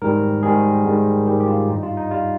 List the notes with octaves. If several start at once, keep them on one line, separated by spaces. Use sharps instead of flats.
G#2 D#3 G3 A#4
G#2 D#3 G3 G#4
G#2 D#3 G3
G#2 D#3 G3 G4
G4
F4
G2 G3 D#4
F4
D#4
G3 F4